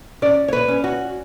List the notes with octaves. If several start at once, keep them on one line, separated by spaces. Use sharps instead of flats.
C#4 D5
C#5
B4
C#4
F#4